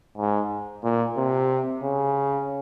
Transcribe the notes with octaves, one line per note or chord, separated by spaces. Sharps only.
G#2
A#2
C3
C#3